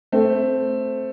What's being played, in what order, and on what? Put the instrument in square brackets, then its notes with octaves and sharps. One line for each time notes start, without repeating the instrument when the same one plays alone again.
[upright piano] A3 C4